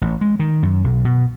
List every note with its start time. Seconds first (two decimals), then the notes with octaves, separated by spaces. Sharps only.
0.01 A1
0.21 G#3
0.39 D#3
0.63 F#2
0.84 B1
1.05 B2